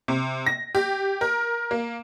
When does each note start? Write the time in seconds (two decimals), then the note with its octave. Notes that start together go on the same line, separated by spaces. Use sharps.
0.08 C3
0.46 A#6
0.75 G4
1.21 A#4
1.71 A#3